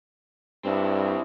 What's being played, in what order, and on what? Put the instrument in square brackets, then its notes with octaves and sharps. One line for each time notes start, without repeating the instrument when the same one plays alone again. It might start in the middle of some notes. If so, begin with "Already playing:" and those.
[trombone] G2 [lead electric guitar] C4 E4